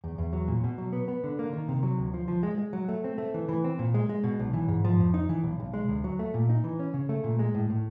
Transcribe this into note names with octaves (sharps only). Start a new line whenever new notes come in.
E2
E2
F#3
A#2
B2
F#3
B3
B3
D3
A#3
D#3
C3
F#3
D2
F3
F3
G#3
G#3
F#3
A3
C4
A3
E3
E3
C4
A#2
G#3
G#3
B2
B1
E3
G#2
F3
F2
D#4
E3
B1
B1
G#3
D2
F#3
A3
A#2
D#4
E3
C#4
C#3
A3
A#2
G#3
A2
A2